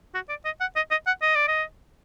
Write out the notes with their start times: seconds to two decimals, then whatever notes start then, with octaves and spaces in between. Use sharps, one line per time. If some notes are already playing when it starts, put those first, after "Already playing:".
0.14 F#4
0.29 D5
0.45 D#5
0.60 F#5
0.76 D#5
0.91 D#5
1.07 F#5
1.22 D#5
1.35 D5
1.48 D#5